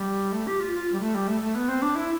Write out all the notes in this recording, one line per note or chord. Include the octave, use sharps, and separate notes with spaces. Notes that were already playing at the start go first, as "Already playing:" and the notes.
Already playing: G3
A3
G4
F4
F4
G3
A3
G3
A3
A3
B3
C4
D4
E4